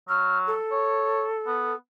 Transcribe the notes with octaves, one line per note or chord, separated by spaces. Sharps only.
F#3 F6
A4
C#5
B3